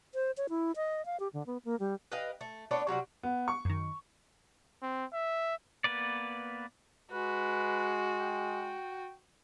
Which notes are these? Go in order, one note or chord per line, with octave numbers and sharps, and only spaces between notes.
C5
C#5
E4
D#5
F5
G4
D3
B3
A#3
G3
B4 D#5 F5 G5
A3
A3 B3 D4 C#5
C3 F#3 G3 F#4
B3
C#6
F#2 D#3
C4
E5
A#3 B3 B4 D5
G#3 F#4 B4
G5